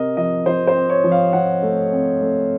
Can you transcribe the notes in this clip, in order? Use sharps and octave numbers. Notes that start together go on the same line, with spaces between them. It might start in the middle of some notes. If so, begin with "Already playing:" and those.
Already playing: C3 C4 A#4 D#5
F3 D#5
F3 C5
C5
C4
C#5
F3
F5
F3 F#5
A3
C4
A3